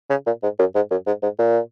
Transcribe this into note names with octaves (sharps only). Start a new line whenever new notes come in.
C#3
A#2
G#2
F#2
G#2
F#2
G#2
G#2
A#2